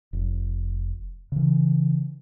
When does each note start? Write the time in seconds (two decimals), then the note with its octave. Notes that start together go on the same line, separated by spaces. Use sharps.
0.13 F1
1.32 C#3 E3